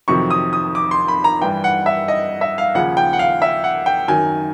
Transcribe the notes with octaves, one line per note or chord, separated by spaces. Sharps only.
F2 C3 D#3 F#3 C#6
D#6
D#6
D6
C6
B5
A#5
G2 E3 G5
F#5
E5
D#5
E5
F5
D#2 C#3 F3 F#5
G5
F#5
F5
E5
F#5
G5
F#2 D#3 F#3 G#5